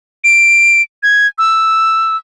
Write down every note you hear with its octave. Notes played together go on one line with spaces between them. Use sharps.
D7
G#6
E6